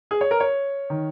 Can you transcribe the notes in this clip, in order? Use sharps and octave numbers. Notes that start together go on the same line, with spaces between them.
G#4
C#5
A#4
C#5
D#3